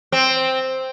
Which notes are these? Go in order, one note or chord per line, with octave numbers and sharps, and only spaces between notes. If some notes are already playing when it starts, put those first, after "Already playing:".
C4